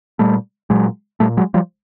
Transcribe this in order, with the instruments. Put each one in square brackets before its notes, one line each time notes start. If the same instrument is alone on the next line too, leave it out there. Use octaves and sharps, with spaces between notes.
[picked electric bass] A#2 G3 A3
A#2 F#3 G#3
A#2 G3 A3
F#3 G#3
F3 G3